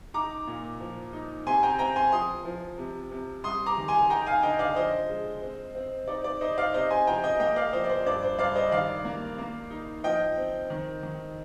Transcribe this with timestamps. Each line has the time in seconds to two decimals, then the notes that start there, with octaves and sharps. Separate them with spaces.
0.14 D#4 A#5 D6
0.47 A#2
0.80 F3
1.13 D#4
1.46 C3 G#5 C6
1.63 G5 A#5
1.79 C4 G5 A#5
1.96 G#5 C6
2.12 F3 C6 D#6
2.45 F3
2.78 C3
3.11 C3
3.44 G3 C6 D#6
3.66 A#5 D6
3.78 D#3
3.88 G#5 C6
4.10 D#4 G5 A#5
4.26 F5 G#5
4.43 D3 D#5 G5
4.59 D5 F5
4.76 F3 C5 D#5
5.09 G#3
5.42 C4
5.75 C4
6.08 D#4 D5
6.24 D5
6.41 D#4 C5 D#5
6.58 D5 F5
6.74 C3 C5 D#5
6.91 G#5 C6
7.07 F3 G5 A#5
7.24 D#5 G5
7.40 A#3 D#5 G5
7.56 D5 F5
7.73 F3 C5 D#5
7.84 D5
7.90 C5
8.06 G2 D5
8.23 C5
8.39 G2 D5 F5
8.56 C5 D#5
8.72 D#3 D5 F5
9.05 A#3
9.38 A#3
9.70 D#4
10.04 F3 D#5 G5
10.37 C4
10.70 D#3
11.03 D#3